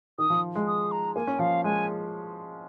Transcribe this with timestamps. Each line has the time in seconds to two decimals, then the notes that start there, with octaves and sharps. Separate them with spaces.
0.18 D#3 D#6
0.30 F3
0.55 G#3
0.67 D#6
0.92 A#5
1.15 A#3 G#5
1.27 C#4
1.39 F3 F5
1.64 G#3 G#5